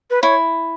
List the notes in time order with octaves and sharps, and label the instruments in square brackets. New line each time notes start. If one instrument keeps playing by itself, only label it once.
[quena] B4
[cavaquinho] E4 [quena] C#5